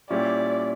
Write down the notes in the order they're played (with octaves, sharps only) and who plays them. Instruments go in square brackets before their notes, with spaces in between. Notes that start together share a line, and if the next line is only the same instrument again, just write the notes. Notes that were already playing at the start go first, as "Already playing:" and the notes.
[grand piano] A#2 G3 C#4 E4 G4 [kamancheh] D5